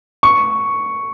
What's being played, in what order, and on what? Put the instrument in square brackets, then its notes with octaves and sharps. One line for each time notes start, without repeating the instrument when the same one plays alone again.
[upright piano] C#6